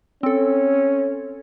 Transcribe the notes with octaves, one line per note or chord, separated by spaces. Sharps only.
C4 C#4 A4